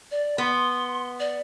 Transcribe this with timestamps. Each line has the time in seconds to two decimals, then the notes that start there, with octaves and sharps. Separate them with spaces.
0.11 D5
0.38 B3 C6
1.20 D5